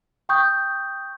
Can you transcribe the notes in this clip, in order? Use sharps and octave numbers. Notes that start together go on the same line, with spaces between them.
G5 C#6 D#6 G6